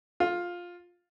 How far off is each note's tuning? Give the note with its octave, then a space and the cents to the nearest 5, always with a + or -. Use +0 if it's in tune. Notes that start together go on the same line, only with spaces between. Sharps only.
F4 +10